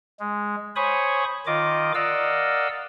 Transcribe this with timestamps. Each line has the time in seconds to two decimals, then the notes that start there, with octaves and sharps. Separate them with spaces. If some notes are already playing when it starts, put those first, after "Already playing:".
0.20 G#3
0.76 C5 C#5 G#5 B5 C#6 D#6
1.46 D#3 F4 D#5 D6
1.94 A#4 D5 D#5 F5 F#5 E6